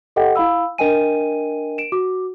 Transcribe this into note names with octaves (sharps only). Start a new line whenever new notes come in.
G4 A4 D#5 F#5 G5
E4 F5 B5 E6
D4 A#4 D#5 G5 G#5 D#7
D7 E7
F#4 D6